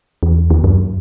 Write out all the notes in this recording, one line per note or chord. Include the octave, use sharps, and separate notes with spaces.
E2
D#2
F#2